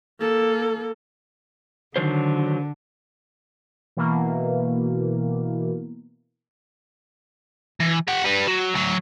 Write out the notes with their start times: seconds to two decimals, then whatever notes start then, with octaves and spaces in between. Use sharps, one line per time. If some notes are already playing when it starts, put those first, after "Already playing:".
0.20 A#3 A4
1.96 D3 D#3 F#3 C5
3.97 B2 E3 A#3
7.80 E3
8.08 G4 F#5
8.24 G3 B4
8.47 F#3
8.74 D2 F#3